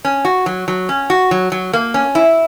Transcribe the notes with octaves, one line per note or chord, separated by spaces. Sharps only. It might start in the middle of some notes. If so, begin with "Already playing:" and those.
C#4
F#4
F#3
F#3
C#4
F#4
F#3
F#3
A#3
C#4
E4